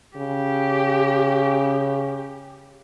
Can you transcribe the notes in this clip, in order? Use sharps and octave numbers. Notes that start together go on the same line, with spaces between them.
C#3 G4